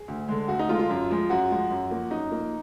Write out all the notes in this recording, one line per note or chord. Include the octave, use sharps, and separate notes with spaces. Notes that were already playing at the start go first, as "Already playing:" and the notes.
Already playing: G#4
D2
D3 G#3
D2 F#4
D#4
D3 G#3 F4
F4
F#2
F3 G#3
F#2 F#4
F3 G#3
F#2
F3 A#3
F#2 D#4
F3 A#3